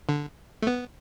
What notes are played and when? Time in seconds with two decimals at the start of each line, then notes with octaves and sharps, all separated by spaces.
0.09 D3
0.62 A3
0.67 B3